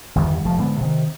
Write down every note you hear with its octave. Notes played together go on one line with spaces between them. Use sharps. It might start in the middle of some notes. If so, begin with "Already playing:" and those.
G1 E2 D#3 G3
F1 F3 A3
G#2 D3 B3
C3 D#3